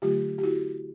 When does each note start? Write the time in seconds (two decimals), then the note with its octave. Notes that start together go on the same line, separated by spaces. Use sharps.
0.02 D3 F#3 A3 F4 G4
0.38 G4
0.43 E4 F#4